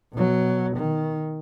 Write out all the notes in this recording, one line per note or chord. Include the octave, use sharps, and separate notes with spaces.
B2 F#3
D#3